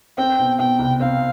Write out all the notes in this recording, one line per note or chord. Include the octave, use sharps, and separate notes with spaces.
C4 G5
B2
B2 G5
C2
C4 F5